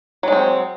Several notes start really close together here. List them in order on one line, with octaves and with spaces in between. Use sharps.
F#3 G#3 C4